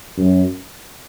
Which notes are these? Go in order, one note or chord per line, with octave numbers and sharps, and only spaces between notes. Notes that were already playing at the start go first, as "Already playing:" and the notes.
F#2